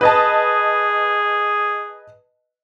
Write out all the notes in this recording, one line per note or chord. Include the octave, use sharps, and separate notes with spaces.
G#4 B4 D#5 A5